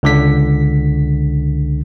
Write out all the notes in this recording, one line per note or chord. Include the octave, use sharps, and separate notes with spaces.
C#2 D3 B6